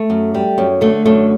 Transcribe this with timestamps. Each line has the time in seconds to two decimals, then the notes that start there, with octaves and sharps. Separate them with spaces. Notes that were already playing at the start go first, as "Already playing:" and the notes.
Already playing: A3
0.10 F#2
0.34 G3
0.58 F#2
0.81 D3 A3
1.06 F#2 A3